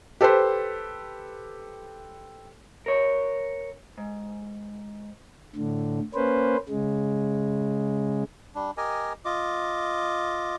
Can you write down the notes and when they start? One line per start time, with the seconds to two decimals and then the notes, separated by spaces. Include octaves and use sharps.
0.21 G4 A4 B4 C5
2.86 A#4 C#5
3.98 G#2
5.56 A2 D3
6.15 A#3 C#4 B4 C5
6.69 C#3 G#3
8.55 G3 D4
8.77 G4 A#4 D#5 G#5
9.25 F4 D#5 D6